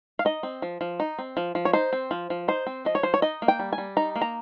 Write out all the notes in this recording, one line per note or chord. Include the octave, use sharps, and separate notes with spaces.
F5
D#4 D#5
C4
F3
F3
D#4
C4
F3
F3
C#5
D#4 C5
C4
F3
F3
D#4 C5
C4
F3 D#5
C#5
F3 C5
C#5
D#4 D#5
A#3
G5
G3
G#5
G3
D#4 A#5
A#3
A#5